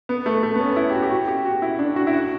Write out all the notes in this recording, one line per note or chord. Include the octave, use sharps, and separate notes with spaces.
B3
A3
A3
B3
C#4
E4
G4
F#4
G4
F#4
G4
F#4
E4
D4
F#4
E4
F#4